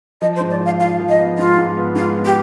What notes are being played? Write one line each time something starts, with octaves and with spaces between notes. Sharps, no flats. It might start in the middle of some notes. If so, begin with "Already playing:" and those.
F3 D#5
C5
G#2
D5
F4
F5
F4 F5
F3
D#5
B3
G#2 F4
G#2
B3
G#2 F4
B3
G4